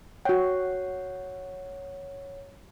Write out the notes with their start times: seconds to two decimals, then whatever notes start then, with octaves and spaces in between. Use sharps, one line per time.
0.25 F#4 C#5 F#5 G5